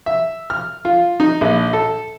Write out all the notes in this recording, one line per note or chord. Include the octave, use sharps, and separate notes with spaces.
E5
F6
F4
D#4
A#1
A4